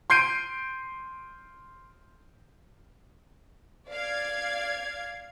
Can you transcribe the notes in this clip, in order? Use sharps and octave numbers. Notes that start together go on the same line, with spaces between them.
C6 G6 C7 D7 D#7
D5 F5 G#6